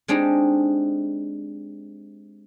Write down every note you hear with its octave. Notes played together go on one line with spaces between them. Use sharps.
G#3 C4 D4 D#4 G4 G#4